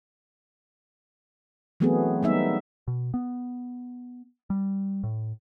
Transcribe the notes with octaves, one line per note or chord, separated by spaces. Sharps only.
E3 F#3 A3 B3 C4 G#4
G3 A#3 B3 D#4 E5
B2
B3
G3
A2